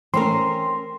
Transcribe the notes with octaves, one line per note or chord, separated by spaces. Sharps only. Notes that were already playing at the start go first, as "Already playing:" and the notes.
E3 A3 C4 C#4 A#4 C6